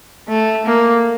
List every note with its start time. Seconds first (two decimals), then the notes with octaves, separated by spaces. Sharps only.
0.28 A3
0.66 A#3